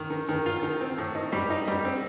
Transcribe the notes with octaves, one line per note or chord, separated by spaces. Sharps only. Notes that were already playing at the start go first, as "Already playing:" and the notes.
Already playing: D#3
D#3
D#3
F4
D#3
C4
A2
D#4
G3
D#4
G3
C4